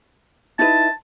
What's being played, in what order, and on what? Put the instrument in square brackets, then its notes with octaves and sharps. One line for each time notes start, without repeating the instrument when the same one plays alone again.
[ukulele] D#4 E4 B4 [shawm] A5